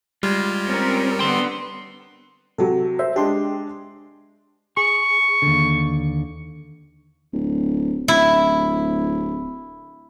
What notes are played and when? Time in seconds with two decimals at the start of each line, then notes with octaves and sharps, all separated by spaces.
0.23 G3 G#3 F4
0.65 C4 C#4 A#4
1.19 D3 B3 G5 C6
2.58 C3 F#3 A4
2.99 C5 E5
3.16 G#3 D4 G4 C6
4.77 G#4 C#6
5.42 D#2 D3
7.33 D1
8.08 D1 E4